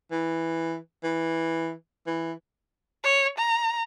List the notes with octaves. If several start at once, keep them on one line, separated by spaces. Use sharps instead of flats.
E3
E3
E3
C#5
A#5